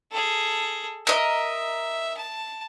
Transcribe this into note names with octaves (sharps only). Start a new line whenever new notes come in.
G#4 A4
A#4 D#5 E5
A5